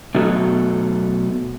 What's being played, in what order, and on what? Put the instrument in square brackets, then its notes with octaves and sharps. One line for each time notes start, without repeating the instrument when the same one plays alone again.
[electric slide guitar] B2 F#3 A3 B3